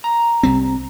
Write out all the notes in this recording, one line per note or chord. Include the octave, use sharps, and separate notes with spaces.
A#5
C2 G3 C4